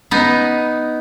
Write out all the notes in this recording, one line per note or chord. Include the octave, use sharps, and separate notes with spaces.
B3 D#4